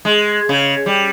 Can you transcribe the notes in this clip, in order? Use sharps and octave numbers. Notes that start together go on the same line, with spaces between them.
G#3
C#3
G3